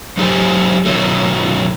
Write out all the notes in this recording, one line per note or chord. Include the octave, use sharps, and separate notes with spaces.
F#3 D#4 G4 A4 C5 G#5
B2 D#3 E3 F#3 A3